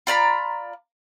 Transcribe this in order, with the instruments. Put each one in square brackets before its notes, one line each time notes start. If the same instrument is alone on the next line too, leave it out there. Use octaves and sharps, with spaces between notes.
[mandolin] F4 D5 A#5 B5